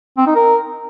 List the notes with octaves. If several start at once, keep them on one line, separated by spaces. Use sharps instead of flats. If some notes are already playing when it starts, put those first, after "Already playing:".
C4
D#4
A#4